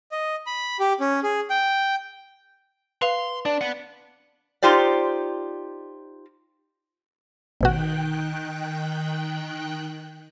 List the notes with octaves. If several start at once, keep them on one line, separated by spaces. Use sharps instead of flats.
D#5
B5
G4
C#4
G#4
G5
B4 F5 C6 F7
D4 D5
B4 F#5
D#4 F4 G4 C5 D5
A1 B2 D#3 F#4 G5 F#6